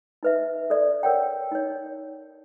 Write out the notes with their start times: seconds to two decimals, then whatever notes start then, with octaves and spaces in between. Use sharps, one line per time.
0.23 D#4 B4 E5
0.70 A4 D5
1.03 A#4 C#5 D5 F#5 G5
1.52 D#4 C#5